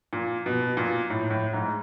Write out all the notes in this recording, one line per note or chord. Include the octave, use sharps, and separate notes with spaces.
A#2
B2
A#2
A2
A2
G#2